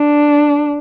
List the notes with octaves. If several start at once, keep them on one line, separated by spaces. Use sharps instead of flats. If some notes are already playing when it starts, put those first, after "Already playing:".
Already playing: D4